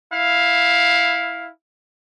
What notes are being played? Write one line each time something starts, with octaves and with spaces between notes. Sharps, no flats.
E4 F5